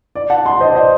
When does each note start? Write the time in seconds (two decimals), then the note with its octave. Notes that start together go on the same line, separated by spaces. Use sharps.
0.15 D5
0.30 F#5 A5
0.45 A5 C6
0.60 C5 D#5
0.70 D5
0.75 C5 D#5